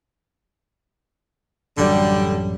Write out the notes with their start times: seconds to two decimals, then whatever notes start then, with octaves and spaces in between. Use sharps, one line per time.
1.78 A1 F#2 D3 F#3 G3